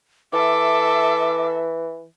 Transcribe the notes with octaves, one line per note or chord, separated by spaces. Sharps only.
E3 A4 E5 D6